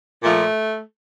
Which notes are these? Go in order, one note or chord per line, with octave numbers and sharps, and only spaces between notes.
A#2 F3 A3